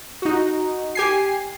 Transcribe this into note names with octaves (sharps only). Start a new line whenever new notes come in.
D#4 F#4
G4 G#5 C7